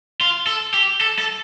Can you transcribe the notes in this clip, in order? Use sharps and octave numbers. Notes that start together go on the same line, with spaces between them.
F4
A4
G4
A4
A4